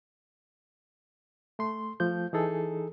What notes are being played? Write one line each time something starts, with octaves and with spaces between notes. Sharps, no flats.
A3 C6
F3 A3 G6
E3 D#4 G#4 A4